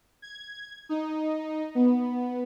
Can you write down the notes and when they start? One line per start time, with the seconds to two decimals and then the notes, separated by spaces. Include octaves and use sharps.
0.22 G#6
0.89 D#4
1.75 B3